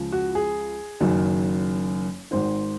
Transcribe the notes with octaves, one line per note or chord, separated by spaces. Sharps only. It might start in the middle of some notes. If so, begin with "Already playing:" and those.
Already playing: C#2 C#3 F3
F#4
G#4
F#1 F#2 D#3 F#3
G#1 G#2 D#3 C5